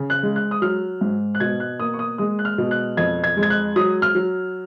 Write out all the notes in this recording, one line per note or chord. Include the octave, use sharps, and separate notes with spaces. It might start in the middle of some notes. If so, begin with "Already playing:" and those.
Already playing: C#3
F#6
G#3
F#6
D#6
F#3 F6
G#2
F#6
B2 G#6
F#6
A#3 D#6
C#6
D#6
G#3 D#6
F#6
F6
B2
F#6
F2 G#6
G#6
G#3
G#6
F#6
F#3 D#6
F6
F#3